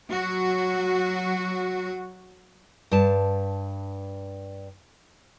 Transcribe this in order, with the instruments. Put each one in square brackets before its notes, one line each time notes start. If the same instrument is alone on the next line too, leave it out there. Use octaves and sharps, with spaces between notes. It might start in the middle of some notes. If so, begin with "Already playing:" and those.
[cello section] F#3 F#4
[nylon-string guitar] G2 A5